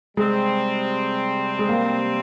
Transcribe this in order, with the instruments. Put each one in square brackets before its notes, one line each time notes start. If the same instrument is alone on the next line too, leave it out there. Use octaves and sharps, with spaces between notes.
[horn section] C3 G3 C4 [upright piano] G#3
[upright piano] G#3
A#3